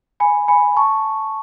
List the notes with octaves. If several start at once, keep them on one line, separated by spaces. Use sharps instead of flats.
G#5 B5
G#5 B5
A5 C#6